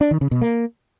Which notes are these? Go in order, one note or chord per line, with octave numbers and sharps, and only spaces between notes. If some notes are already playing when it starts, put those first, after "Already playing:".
D4
D#3
C#3
B2
A#3